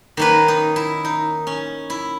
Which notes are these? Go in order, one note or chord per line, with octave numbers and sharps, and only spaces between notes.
D#3 A#3 C#4 B4
D#4
E4
D#4
C#4
E4